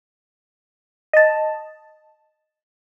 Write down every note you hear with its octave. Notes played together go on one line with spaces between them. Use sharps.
D#5 A5